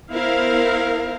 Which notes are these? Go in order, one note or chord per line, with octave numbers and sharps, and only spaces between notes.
B3 E4 A#4 C5 F5